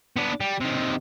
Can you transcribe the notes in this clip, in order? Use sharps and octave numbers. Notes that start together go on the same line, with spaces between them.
B3 D4
G3
C3 D#3